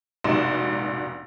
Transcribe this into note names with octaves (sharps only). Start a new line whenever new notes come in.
F1 A#1 G#2 B2 D#4 E7